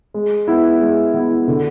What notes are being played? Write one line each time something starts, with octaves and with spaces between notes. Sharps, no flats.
G#3
B3 E4
G#3
B3 E4
D3